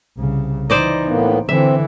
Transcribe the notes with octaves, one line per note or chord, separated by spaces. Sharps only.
C2 C#3
E3 D#4 C5 D5 D#5
A2 A#3 B3
D3 E3 C4 E5